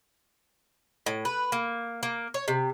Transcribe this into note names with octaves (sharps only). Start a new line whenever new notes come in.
A2
B4
A#3
A#3
C#5
C3